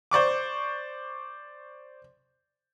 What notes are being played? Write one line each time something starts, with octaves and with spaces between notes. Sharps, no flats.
C5 D5 C#6 D6